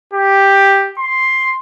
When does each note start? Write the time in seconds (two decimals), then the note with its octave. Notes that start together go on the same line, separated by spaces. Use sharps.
0.13 G4
0.99 C6